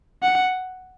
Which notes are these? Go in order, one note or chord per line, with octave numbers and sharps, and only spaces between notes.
F#5